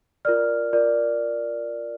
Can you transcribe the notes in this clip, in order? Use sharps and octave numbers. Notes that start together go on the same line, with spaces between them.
F4 A#4 D5 F6
F4 A#4 D5